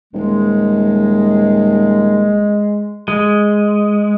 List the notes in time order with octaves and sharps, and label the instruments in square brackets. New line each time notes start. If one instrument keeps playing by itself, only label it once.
[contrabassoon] D#1 [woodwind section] G#3
[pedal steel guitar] G#3